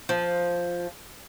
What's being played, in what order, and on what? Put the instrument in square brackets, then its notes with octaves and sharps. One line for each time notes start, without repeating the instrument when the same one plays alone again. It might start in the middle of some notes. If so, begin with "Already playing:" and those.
[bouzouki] F3